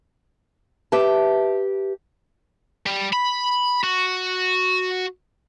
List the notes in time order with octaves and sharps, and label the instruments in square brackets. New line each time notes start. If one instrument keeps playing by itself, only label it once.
[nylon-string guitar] G4 B4 E5 A5
[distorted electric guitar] G3
B5
F#4